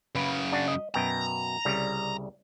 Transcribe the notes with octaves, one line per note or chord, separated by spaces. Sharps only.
F#2 C#3 B4
D4 F#4
D#5
F#2 B2 G5 A#5
C2 C#3 G3